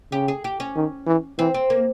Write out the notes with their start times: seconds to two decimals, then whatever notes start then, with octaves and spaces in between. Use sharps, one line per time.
0.12 C#3 G4
0.28 G#4
0.44 G4
0.60 C#4
0.76 D#3
1.07 E3
1.38 E3 C4
1.54 C4
1.70 A#3